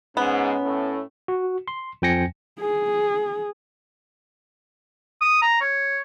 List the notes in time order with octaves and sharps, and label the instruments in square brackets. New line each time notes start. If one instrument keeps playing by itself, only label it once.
[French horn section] G#2 [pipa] B3 [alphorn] C#4
[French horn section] A2 A3
[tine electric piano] F#4
C6
F2 F3 G5 G#5 A#6 C#7
[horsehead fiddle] G#4
[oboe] D#6
A#5
C#5